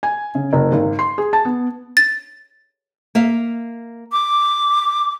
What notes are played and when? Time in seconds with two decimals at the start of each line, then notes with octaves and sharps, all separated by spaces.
0.03 G#5
0.35 C#3
0.53 F#1
0.72 G#1
0.99 C6
1.18 G#4
1.33 A5
1.45 B3
1.97 A6
3.15 A#3 E5 F5
4.12 D6